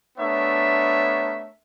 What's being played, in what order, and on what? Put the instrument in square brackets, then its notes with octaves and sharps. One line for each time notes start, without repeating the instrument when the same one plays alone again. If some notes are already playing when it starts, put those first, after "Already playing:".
[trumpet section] A3 B3 D4 A#4 C#5 E5